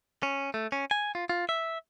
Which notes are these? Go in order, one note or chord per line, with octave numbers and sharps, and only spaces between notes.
C#4
A3
C#4
G#5
F4
F4
E5